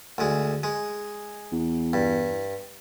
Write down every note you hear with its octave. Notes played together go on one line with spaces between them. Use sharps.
D2 G#3
G#3
E2
G2